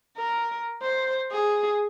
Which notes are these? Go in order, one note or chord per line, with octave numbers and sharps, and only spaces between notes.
A#4
C5
G#4